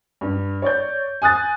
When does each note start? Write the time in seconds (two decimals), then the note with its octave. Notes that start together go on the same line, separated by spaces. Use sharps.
0.21 G2
0.62 C#5 D5 G6
1.22 G#5 D#6 F#6 A6